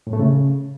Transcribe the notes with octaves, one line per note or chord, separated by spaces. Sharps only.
A2
A3
C#3